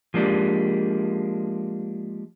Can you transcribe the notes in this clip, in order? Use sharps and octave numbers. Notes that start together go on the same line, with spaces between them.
F3 G#3 A#3 D4 G4